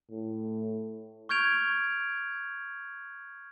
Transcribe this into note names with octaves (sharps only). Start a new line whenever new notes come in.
A2
C#6 F6 G6 G#6 D7 F7